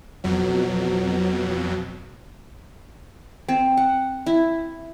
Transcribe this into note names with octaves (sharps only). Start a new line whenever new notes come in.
F2 B2 F#3
C4
F#5
E4